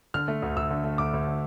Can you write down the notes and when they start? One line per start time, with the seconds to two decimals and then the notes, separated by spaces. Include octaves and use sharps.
0.14 D3 F6
0.28 A3
0.42 D2
0.56 D2 E6
0.70 D3
0.84 A3
0.98 D2 D6
1.13 D2
1.27 D3